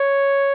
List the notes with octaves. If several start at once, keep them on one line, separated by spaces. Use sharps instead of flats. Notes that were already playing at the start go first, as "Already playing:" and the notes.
Already playing: C#5